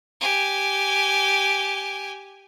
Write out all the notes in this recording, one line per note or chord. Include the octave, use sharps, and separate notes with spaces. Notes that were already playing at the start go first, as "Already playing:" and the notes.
G4 G#5